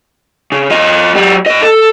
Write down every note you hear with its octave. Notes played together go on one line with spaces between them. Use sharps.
C#3
F3 D#5
F#3 G4
A#2 D#5
A4